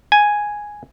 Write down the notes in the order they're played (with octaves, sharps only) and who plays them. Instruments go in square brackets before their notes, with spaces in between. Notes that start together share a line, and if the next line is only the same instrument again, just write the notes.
[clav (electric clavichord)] G#5